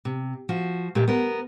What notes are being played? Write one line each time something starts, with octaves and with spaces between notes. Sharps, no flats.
C3
F3 F#4
A#2 A3 G4
B3 A#4